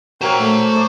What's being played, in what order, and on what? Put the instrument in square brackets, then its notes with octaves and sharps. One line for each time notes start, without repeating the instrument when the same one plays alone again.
[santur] F#3 A#3 C#5 [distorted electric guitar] C5 A#5 [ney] G5
[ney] A3
[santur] D5 C#6